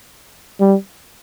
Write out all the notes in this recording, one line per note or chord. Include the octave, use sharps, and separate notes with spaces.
G3